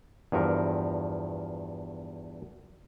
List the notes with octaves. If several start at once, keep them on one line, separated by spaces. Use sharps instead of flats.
E2 G2 F3 A#4